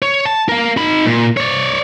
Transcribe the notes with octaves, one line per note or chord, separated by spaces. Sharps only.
C#5
A5
A#4 F5
D#4 B5
A#2
C#5 D5